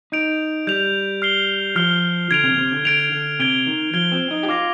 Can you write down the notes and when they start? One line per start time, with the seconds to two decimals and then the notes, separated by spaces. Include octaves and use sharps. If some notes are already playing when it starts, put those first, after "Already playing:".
0.12 D#4 G6 D7 F7
0.67 G3 G6 D7 F7
1.22 F6 C7 G7
1.75 F3 F6 C7 G7
2.31 D3 G#6 D7 F7
2.44 C3
2.58 C3
2.72 D3
2.85 D3 G#6 D7 F7
3.12 D3
3.39 C3 G#6 D7 G7
3.66 D#3
3.94 F3 G#6 D7 G7
4.12 C4
4.31 D#4
4.43 G4
4.48 F4 D6 F6 A#6 F7